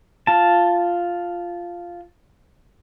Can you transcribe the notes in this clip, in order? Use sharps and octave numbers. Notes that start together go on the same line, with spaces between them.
F4 A5